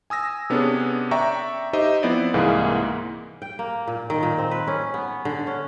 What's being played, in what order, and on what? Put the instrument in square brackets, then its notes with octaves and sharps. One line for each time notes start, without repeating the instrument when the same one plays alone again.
[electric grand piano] G#5 D#6 E6 A#6
C3 B3 C#4 D4 G#4 A4
D5 E5 G5 A#5 C#6
D#4 G4 C5 D#5 E5
F3 B3 C4 E4 C5 D5
C2 G#2 E3 A#3 G#4 F5
[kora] G5
A#3
A#2
D#3
A#2
C4
B4
C#4
B3
D3
C#4